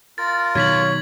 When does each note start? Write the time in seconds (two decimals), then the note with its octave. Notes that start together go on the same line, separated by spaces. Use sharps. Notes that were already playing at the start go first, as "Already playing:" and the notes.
0.18 F4 A#4 A6
0.55 B2 D#3 F#3 C#5 G#6 B6 F#7